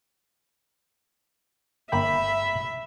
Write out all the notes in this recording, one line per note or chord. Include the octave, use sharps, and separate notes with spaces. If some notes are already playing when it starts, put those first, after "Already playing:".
G1 A#3 E5 G5 B5